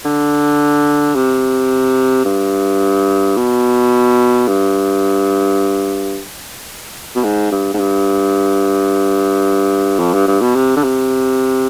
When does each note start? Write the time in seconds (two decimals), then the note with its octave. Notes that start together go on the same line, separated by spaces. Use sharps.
0.05 D3
1.15 C3
2.25 G2
3.36 B2
4.47 G2
7.15 B2
7.24 G#2
7.51 G2
7.74 G#2
7.79 G2
9.99 F2
10.14 G2
10.27 G2
10.41 B2
10.55 C3
10.76 D3
10.83 C3